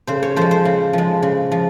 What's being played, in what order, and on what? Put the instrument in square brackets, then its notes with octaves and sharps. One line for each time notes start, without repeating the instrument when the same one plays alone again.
[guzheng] C#3 C5
C#5
F3 G#3 C5
C5
C#3
F3 G#3
C#3
F3